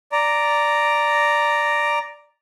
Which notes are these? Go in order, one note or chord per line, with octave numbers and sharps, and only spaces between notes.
D5 A#5